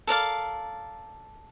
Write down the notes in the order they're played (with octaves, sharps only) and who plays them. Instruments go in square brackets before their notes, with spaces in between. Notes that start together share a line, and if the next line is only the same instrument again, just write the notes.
[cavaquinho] A4 A#4 D5 F5